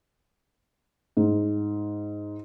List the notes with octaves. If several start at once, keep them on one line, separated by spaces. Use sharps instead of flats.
G#2